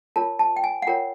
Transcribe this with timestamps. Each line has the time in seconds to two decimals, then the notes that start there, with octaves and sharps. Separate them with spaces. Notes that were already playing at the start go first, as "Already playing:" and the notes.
0.16 F4 A#4 C#5 A5
0.39 A5
0.56 G5
0.64 G#5
0.82 F#5
0.87 F4 A#4 C#5 G5